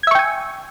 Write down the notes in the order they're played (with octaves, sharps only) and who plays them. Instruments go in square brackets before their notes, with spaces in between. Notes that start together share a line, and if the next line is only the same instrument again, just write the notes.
[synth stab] G#6
E5
C#6
G5
G#5